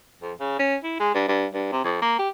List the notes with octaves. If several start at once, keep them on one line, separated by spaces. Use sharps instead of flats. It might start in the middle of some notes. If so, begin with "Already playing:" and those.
F2
C#3
C#4
E4
G#3
G2
G2
G2
C3
F2
A#3
G4